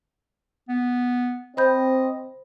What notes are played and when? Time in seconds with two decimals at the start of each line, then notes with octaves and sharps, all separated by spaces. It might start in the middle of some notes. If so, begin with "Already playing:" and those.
0.69 B3
1.57 C4 C5 D#5 B5 G6